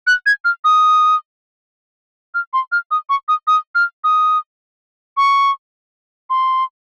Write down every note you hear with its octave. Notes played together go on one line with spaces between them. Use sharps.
F#6
G#6
F6
D#6
F6
C6
F6
D#6
C#6
D#6
D#6
F6
D#6
C#6
C6